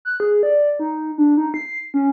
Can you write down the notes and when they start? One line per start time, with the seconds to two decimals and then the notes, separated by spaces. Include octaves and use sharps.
0.05 F#6
0.20 G#4
0.43 D5
0.79 D#4
1.18 D4
1.37 D#4
1.54 C7
1.94 C#4